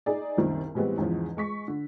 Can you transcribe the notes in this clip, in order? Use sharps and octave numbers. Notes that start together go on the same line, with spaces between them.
D#4 G#4 D5
F#1 C2 D#3 C4
A2 E3 G3 G#3 B3 C4
E2 G#2 C#3 E3 F3
G#3 C#6 B6
D3